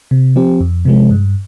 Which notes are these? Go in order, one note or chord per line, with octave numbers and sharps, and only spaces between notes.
C3
F3 C4 G4
F2
C3 F3 G#3
G2